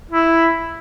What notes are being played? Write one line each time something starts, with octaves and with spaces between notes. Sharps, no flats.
E4